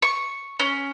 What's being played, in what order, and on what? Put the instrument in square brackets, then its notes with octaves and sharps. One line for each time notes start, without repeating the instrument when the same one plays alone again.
[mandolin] C#6
C#4